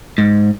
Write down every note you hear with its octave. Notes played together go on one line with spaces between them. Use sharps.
G#2